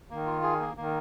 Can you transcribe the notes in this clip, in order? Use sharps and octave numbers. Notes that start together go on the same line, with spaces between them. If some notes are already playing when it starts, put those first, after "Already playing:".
D#3 A#3
F4
G#4
A#3
D#3 A#3